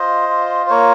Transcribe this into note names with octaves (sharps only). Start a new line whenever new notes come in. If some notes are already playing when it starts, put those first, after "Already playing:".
Already playing: F4 C5 D#5
F4
C5
A#3 A#4 C#5